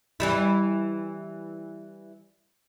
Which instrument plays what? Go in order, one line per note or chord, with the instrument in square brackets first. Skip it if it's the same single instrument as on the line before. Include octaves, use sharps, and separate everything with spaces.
[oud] E3 G3 E4